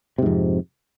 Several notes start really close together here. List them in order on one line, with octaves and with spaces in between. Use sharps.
C3 G#2 F2